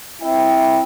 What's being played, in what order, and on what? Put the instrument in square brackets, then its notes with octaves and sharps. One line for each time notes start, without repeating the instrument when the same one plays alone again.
[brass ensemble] C4 E4 E5 G5